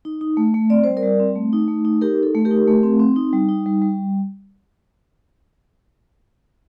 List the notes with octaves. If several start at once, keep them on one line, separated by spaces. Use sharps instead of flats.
D#4
D#4
A3
A3
C4 D5
G3 C5
A#4 D5
G3
C4
A3
D#4
A3
D#4
D#4 G4 A#4
D#4 A4
A3
G4 A#4
D#4
A3
C4
C4
D#4
G3
D#4
G3
G3